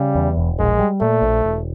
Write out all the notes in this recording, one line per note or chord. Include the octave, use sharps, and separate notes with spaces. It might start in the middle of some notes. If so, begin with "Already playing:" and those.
Already playing: C#3 G3
E2
E1
A#1 G#3
G3
A#2 A3
A#1
E1